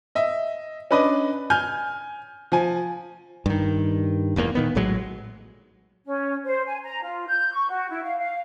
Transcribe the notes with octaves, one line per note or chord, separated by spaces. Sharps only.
D#5 E5
C#4 D4 B4 D5 D#5
G#5 F6 G6
F3 G#5
G2 D#3
E1 E2 E3 A#3
A#2 D#3 B3
A#1 A2 F#3 G#3
C#4
C5
G#5
A#5
F4
G6
C#6
F#4
E4
F5
F5